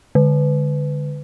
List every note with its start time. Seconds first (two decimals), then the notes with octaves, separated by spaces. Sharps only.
0.15 D3